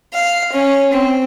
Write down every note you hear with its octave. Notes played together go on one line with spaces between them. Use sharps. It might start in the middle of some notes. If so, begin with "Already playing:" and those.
F5
C#4
C4